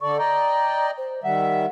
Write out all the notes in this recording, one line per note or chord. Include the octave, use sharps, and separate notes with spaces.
D3 A4 D5 C#6
D5 D#5 G5 A#5
C5
D#3 G3 E5 F#5